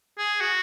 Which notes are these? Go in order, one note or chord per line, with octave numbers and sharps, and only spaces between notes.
G#4
F#4